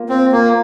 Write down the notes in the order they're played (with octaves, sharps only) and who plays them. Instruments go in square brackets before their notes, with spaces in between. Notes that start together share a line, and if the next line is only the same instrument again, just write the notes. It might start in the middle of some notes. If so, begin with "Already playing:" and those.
Already playing: [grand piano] A#3 F4
[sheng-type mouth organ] C4 [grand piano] C5
[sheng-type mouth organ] A#3 [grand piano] F4